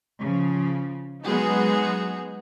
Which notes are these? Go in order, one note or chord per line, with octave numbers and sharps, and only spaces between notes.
C#3 F3
F#3 G#3 B3 D#4 F#4 G#4